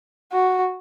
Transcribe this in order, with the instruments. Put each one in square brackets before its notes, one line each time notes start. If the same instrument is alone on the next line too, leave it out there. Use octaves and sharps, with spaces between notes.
[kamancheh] F#4